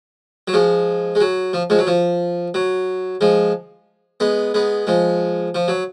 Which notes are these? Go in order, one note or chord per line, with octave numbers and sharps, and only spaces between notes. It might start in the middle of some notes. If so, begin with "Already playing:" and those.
F#3
F3 G#3
G#3
F#3
F3
F3 G#3
F#3
F3
F#3
F3 G#3
G#3 B3
G#3 B3
F3 G#3
F3
F#3